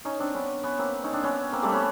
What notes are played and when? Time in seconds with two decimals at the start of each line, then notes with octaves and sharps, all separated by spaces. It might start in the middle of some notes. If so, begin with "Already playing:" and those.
0.05 C#4 D#4
0.19 C4 D4
0.34 B3 C#4
0.63 B3 C#4
0.78 A#3 C4
1.03 C#4 D#4
1.13 C4 D4
1.23 B3 C#4
1.52 A#3 C4
1.63 G3 A3
1.72 B3 C#4